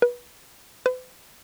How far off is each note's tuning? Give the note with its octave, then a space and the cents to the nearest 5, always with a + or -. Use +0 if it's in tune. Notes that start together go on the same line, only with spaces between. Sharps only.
B4 -25
B4 +45